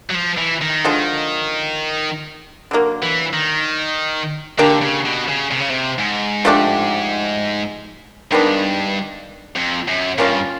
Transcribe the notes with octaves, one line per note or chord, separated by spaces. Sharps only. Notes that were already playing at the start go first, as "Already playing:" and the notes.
F#3
F3
E3
D#3
D3 F3 G#3
D3 F#3 A#3
E3
D#3
D3 A#3 D4 G4
C#3
B2
C#3
C3
C#3
C3
G#2
F3 A3 D4 G4
G2 D#3 G#3 B3 D4
F2
F#2
G2 A#3 C#4 F4